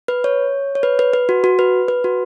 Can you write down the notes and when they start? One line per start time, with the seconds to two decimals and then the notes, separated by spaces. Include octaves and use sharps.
0.08 B4
0.24 C#5
0.75 C#5
0.83 B4
0.99 B4
1.13 B4
1.29 F#4
1.44 F#4
1.59 B4
1.88 B4
2.04 F#4